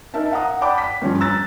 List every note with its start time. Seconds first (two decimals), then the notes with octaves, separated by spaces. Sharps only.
0.14 D#4 A#4 E5 A5
0.32 F5 F#5 A#5 D#6
0.61 D5 F#5 G5 A5 B5 D6
0.78 B6
1.02 G2 D3 F3 C#4
1.20 A#5 E6 F#6 A6